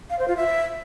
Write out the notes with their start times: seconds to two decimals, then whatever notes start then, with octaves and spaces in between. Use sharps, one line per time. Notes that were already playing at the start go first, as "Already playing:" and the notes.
0.10 F5
0.19 C5
0.28 F4
0.37 E5